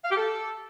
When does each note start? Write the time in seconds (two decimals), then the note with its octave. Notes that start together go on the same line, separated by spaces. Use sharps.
0.05 F5
0.11 G4
0.17 A4